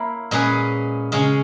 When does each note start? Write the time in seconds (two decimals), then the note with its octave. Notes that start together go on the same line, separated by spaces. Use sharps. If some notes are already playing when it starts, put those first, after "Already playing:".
Already playing: A#3 E4 A#4 C#5
0.31 A#2 G#3 C#4 G#4 B4
1.12 C#3 G#3 C#4